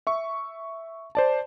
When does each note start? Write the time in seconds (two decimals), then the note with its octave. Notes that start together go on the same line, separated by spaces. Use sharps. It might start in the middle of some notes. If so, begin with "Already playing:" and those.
0.07 E5 C#6
1.15 C5 D5 A5